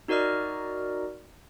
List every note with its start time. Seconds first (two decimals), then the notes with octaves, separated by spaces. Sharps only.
0.08 D#4 F#4 A#4 D5 D#5 F6